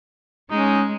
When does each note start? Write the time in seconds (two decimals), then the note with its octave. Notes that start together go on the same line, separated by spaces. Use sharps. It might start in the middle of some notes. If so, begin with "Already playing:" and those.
0.51 G#3 C#4 D#4